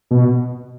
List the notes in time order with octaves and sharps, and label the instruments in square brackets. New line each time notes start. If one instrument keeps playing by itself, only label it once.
[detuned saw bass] B2